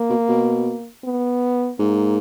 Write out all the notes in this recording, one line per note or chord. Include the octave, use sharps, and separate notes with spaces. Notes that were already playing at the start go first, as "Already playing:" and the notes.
Already playing: A#3
B2
B2
B3
G#2 A#3